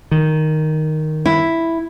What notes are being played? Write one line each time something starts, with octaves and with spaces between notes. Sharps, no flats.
D#3
E4